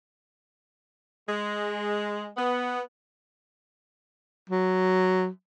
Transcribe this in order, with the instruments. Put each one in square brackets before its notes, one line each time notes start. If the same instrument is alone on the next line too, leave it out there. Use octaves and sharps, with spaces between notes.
[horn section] G#3
B3
[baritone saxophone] F#3